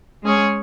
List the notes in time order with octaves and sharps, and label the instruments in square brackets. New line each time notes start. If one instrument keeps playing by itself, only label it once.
[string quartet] G#3 C#4 G#4 C#5